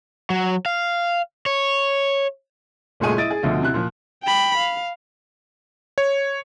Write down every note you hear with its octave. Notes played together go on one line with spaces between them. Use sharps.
F#3
F5
C#5
F#1 A#2 G#3 A3 G#4 D#7
E4 D#5 A6 D7
G#4
D2 B2 D3 F3 E5
C3 E4 F#6
A#2 F3
G5 B5
F5
C#5